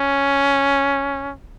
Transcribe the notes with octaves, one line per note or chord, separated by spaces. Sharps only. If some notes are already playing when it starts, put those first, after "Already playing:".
Already playing: C#4